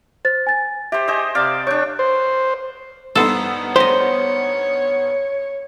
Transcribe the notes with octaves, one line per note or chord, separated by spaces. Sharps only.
C5 A6
G#5 A6
G4 C5 E5
G#4 C5 D#5
C3 D5 F5
D4 C#5 C#6 G6
C5
G2 B3 D#4 A4 C5
G4 C5 C#5 D#5